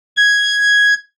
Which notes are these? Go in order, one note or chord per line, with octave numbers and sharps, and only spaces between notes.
G#6